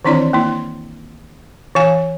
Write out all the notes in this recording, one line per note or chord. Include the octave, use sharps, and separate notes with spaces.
D#3 E3 C4 D4 E4 D5
A#3 E4
E3 F5 G#5